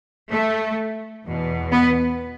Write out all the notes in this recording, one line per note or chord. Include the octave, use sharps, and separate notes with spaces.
A3
E2 B2
B3